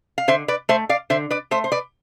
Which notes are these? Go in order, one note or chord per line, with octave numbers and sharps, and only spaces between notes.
F5
D3 C5 E5
B4 D5
A3 C5 E5
D5 F5
D3 C5 E5
B4 D5
A3 C5 E5
C5
B4 D5